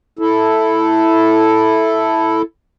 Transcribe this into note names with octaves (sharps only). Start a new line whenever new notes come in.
E4 A4